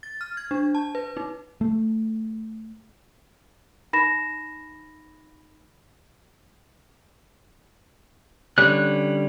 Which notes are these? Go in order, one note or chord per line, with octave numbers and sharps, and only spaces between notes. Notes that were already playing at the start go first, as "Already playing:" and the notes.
A6
F6
G#6
D4
A5
B4
D#4
A3
D#4 B5 A#6 E7
D3 G3 C#4 F#6